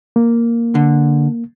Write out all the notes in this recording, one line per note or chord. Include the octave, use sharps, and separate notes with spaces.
A#3
D3